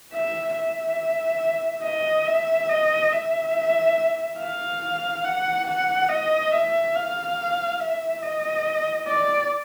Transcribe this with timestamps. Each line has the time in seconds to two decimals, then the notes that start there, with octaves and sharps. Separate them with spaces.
0.13 E5
0.56 E5
1.83 D#5
2.26 E5
2.69 D#5
3.12 E5
4.39 F5
5.25 F#5
5.67 F#5
6.09 D#5
6.52 E5
6.95 F5
7.80 E5
8.23 D#5
9.08 D5